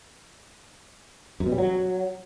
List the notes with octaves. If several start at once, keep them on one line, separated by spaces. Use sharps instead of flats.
F#2
B2
G3
F#3